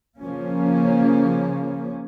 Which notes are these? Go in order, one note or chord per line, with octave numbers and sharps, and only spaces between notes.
C#3 F3 A#3 C#4